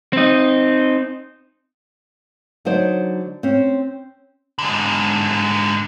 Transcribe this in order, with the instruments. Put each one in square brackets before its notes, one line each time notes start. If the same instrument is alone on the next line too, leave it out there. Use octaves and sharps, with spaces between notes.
[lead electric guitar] C4 D#4
[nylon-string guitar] D3 F#3 D#4 C5 D5
C4 C#4
[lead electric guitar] G#2 D3